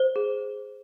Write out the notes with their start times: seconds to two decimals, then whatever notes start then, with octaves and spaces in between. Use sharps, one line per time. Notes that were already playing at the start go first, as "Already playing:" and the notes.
Already playing: C5
0.16 G#4